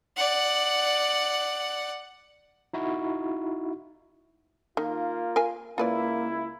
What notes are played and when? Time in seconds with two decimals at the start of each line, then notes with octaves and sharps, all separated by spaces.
0.16 D5 F#5
2.73 D#4 E4 F#4
4.77 D#3 A#3 F4
5.36 A#4 F5 G#5
5.78 C#2 A#3 E4 F4 B4 D5